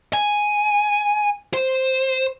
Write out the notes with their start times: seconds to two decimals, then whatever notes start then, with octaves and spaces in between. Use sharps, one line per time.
0.13 G#5
1.54 C5